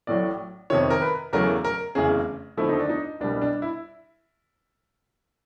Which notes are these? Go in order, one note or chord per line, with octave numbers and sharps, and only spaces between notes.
A1 A2 F#3 D5
F2 C3 D#3 C#5
A#4
B4
E2 C#3 F#3 A3 A#4
A#4
F1 E2 C#3 G#4
D#2 D3 F3 A3 E4
D#4
D4
D#4
C2 B2 G3 D4
D4
E4